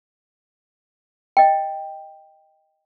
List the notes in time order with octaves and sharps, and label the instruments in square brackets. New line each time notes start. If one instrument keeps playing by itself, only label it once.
[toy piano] D#5 G5